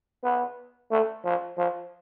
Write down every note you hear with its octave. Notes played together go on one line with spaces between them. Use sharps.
B3
A3
F3
F3